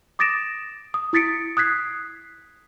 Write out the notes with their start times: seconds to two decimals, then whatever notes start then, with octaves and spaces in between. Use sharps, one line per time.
0.19 D6 D#6 A6 A#6 D7 E7
0.94 D#6
1.13 E4 D#6 A6 B6 C#7 D7
1.57 D#6 F#6 G#6 B6 C7